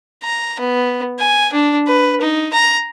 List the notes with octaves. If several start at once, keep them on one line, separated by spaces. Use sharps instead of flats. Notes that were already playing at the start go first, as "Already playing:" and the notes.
A#5
B3
G#5
D4
B4
D#4
A#5